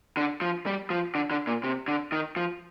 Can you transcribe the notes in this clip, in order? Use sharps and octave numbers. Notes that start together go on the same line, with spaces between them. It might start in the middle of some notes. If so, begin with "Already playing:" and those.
D3
F3
G3
F3
D3
D3
A#2
C3
D3
D#3
F3